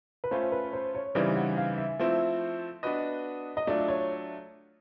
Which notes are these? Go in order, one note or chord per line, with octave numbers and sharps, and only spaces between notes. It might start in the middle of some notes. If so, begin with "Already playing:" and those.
B4
A3 C#4 F4 C5
B4
C5
C#5
C#3 E3 G3 C4 D#4 D5
F#5
F5
E5
F3 A3 C4 E4
B3 D4 F#4 B4 D#5
D#5
F#3 A3 D4 F4 D5
C#5